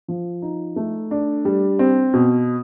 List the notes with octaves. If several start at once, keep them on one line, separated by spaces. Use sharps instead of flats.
F3
D#4
A3
D4
G3
C4
B2